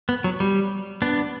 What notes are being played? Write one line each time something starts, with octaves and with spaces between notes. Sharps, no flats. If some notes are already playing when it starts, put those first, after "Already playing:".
B3
F#3
G3
B3 D4